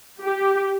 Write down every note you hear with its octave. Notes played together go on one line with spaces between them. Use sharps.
G4